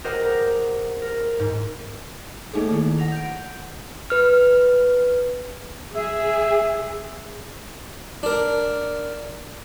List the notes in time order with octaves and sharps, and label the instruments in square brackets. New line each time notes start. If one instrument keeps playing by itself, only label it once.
[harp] G4 G#4 A#4 C5 D#5 F#5
A#4
A#4
G#2
[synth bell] A3 A#3 D#4 G#4 A4
D#3 E4
F#5 A#6 F7
G6 D7
[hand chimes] B4 F6
[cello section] G#4 [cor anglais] E5
[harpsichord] D4 A#4